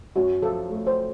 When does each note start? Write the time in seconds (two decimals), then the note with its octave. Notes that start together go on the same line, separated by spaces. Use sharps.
0.16 F#2 F#4
0.42 F3 A4
0.69 A3
0.87 C5